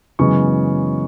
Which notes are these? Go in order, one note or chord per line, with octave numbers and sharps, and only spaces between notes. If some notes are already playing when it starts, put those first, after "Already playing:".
F#2 C#3 E3 G#3 B3 C#6